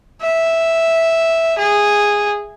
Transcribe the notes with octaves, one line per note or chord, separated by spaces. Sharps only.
E5
G#4